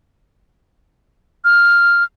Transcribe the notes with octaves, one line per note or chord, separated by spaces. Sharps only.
F6